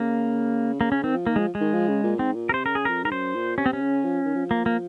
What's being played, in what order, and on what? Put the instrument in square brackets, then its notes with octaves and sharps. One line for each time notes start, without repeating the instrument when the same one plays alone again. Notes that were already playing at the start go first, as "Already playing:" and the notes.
Already playing: [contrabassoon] C#3 [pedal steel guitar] A#3
[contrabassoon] C#3 [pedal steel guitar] A#3
[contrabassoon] C#3 [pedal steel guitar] C#4
[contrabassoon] D#3 [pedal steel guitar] C4
[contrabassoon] F3
[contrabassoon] D#3 [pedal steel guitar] A#3
[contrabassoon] F3 [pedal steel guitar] G#3
[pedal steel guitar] G#3
[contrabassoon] D#3
F3
C#3
A#2
[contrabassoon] G#2 [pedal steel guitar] C4
[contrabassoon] A#2
[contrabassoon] C3 [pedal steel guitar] A#4 C5
[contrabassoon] C#3 [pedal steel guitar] A#4
[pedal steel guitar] G#4
[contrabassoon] F2 [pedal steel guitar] A#4
[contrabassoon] G#2 [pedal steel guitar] A#4
[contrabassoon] F#2 [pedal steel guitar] C5
[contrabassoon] A#2
[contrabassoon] C3 [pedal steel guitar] C#4
[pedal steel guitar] C4
C#4
[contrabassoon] C#3
F3
D#3
F3
[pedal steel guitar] A#3
A#3